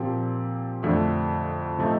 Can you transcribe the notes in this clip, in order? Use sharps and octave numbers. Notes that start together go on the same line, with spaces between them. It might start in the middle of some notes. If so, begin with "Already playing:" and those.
Already playing: A#2 F3 C4 G4
F2 D3 A3
C3 F3 A3 D#4